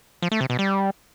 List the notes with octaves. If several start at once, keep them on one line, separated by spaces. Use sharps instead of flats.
F3
A3
C3
B2
G3